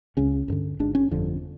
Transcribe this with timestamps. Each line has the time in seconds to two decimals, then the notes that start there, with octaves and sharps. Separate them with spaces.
0.17 C#2 C#3 C#4
0.48 A1 G2 D3
0.79 G#1 G#2 D4
0.95 C#4
1.11 G1 F2 D3